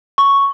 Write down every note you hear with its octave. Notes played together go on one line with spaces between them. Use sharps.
C#6